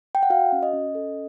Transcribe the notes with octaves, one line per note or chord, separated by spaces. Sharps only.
G5
F#5
F#4 F5
C#4
D#5
C#4
A4